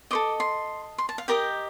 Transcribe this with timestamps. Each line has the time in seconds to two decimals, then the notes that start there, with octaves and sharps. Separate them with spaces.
0.11 A4 C5 D#5 D6
0.40 C6
0.98 C6
1.09 A5
1.18 F5
1.28 G4 A#4 D#5 G5